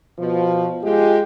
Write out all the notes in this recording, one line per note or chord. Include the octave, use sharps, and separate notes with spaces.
B2 F3
G#3 F4 G4